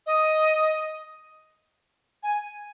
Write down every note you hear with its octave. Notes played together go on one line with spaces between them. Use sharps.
D#5
G#5